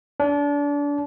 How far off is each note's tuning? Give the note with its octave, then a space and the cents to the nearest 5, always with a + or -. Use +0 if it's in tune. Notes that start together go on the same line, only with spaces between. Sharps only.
D4 -30